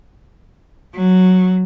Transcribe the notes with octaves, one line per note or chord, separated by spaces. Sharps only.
F#3